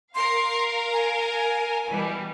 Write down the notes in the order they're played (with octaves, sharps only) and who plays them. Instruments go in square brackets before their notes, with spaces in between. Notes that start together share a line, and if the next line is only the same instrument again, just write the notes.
[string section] A#4 F5 [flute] C6
[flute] G#5
[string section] B2 E3 G3